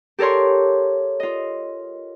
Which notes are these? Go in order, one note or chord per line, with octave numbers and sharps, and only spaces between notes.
G4 A4 A#4 C#5 C6
F4 D#5